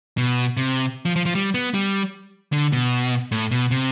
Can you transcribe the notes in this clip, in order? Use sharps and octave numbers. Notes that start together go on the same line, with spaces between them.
B2
C3
F3
F3
F3
G3
B3
G3
D3
B2
A2
B2
C3